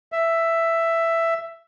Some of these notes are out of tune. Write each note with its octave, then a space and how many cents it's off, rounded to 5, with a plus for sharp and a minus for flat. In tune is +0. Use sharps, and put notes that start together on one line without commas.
E5 +10